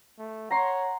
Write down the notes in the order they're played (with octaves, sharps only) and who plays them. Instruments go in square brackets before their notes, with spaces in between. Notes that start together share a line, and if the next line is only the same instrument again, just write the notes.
[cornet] A3
[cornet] C#5 [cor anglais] F#5 [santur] A#5 C6